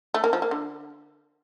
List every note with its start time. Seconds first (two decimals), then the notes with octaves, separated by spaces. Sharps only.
0.14 A3
0.24 A#3
0.33 F3
0.42 A#3
0.51 D3